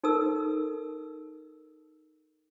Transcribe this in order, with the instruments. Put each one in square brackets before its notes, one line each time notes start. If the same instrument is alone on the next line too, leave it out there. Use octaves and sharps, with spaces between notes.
[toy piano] D#4 A4 A#4 E6